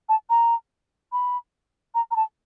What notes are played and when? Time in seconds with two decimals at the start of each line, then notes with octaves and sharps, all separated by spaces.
0.09 A5
0.30 A#5
1.13 B5
1.95 A#5
2.11 A#5
2.16 A5